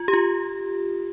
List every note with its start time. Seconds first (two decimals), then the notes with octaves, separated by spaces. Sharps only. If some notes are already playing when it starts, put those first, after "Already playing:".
Already playing: F4
0.08 G4
0.13 F4